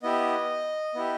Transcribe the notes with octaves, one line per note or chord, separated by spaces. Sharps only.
B3 E4 G4 D#5
B3 E4 G4